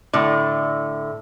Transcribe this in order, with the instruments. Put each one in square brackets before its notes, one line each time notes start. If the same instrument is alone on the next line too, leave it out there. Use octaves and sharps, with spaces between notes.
[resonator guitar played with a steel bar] A2 D3